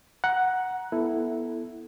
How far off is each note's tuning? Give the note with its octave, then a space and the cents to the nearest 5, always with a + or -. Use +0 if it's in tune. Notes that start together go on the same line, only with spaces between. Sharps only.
F#5 +0 A#5 +20
B3 -15 E4 +0 A4 +0